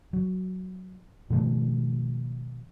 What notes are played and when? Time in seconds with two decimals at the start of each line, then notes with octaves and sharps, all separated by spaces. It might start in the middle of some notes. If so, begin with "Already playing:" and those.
0.13 F#3
1.30 B2 D#3 F3 A3